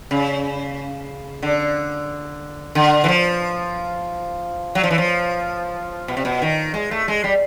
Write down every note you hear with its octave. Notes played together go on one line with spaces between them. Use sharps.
C#3
D3
D3
E3
F3
F#3
F3
E3
F3
B2
C3
B2
D#3
G#3
A3
G#3
G3